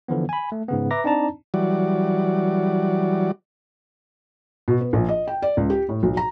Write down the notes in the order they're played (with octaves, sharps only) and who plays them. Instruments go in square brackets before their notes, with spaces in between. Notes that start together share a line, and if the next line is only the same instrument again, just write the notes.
[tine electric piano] D3 E3 F3 B3
G#5 B5
A3
G#2 C#3 B3
B4 E5 A#5 D6 A#6
C4 D4 D#4 D5 A5 A#5
[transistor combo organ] E3 F#3 G3 F#4 D5
[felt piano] B2
B3
A#1
D#5
G5
D5
C#2
G4
A2
B1
A#5